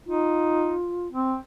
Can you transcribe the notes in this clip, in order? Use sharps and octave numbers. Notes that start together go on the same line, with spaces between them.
D#4 F4
C4